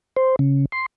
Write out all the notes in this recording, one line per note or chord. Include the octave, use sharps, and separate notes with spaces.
C5
C#3
C6